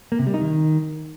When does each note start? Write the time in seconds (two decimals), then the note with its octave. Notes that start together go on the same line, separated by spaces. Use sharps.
0.12 A#3
0.19 C3
0.27 G3
0.34 D#4
0.41 D#3